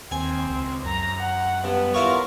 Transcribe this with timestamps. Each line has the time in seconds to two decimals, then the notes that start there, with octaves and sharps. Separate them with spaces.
0.11 D#2 C4 G#5
0.50 C#2
0.85 F#2 A#5
1.19 F#5
1.64 G2 B3
1.94 E4 F4 A#4 C#5